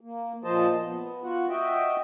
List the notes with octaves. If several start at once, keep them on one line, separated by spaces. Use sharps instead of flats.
A#3
A#2 F3 C5 D#5 A5
B3
F4 F#4 F#5
F#4 D#5 E5 G5